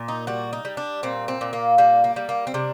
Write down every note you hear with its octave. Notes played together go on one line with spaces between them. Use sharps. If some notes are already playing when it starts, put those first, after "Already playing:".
Already playing: A#2
D#4
G3 F#4
D#4
G3
D4
A#2 C4
C4
A#2
A#3
G3 A#3
A#3
G3
A#3
C4
C3 D4